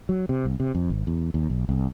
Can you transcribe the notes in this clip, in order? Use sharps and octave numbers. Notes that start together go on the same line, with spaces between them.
F#3
C3
C2
C3
F2
G#1
E2
D#2
B1
C2